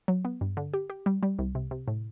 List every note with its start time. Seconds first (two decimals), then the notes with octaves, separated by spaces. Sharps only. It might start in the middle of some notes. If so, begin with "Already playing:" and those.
0.08 F#3
0.25 B3
0.41 G2
0.57 D3
0.74 G4
0.90 G4
1.06 G3
1.23 G3
1.39 C2
1.55 C3
1.71 C3
1.88 A2